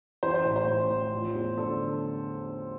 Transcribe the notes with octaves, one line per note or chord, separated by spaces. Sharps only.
E3 C5
C5
A1
C5
A2
A1
F3
E2
D3 A4